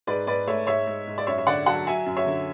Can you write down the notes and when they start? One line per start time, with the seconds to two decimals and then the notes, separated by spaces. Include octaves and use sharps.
0.07 G#2 B4 D5
0.27 G#2 B4 D5
0.47 A3 C#5 E5
0.67 G#2 C#5 E5
0.87 G#3
1.07 G#2
1.18 D5
1.27 F#2 C#5 E5
1.38 E5
1.47 D3 D5 F#5
1.66 F#3 F#5 A5
1.86 F#3 E5 G#5
2.06 F#2
2.17 C#5 E5
2.27 D3